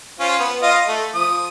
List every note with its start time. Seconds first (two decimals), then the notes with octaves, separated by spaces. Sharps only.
0.20 C#4 F4 C5
0.39 B3
0.62 F4 D#5 F5
0.88 A3
1.15 F3 D#6